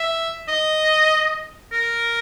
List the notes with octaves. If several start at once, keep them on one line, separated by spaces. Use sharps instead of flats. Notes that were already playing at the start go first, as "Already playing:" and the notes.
Already playing: E5
D#5
A#4